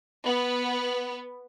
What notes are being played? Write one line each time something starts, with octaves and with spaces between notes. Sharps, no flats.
B3